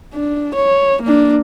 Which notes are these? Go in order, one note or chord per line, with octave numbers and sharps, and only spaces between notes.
D4
C#5
A#3 D4